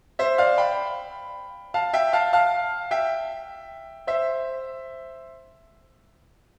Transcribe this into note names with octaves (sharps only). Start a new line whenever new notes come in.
C5 E5
D5 F5
G5 B5
F5 A5
E5 G5
F5 A5
F5 A5
E5 G5
C5 E5